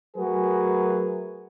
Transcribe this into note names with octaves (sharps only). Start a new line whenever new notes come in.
F#3 A3 F#4 G#4 A#4 B4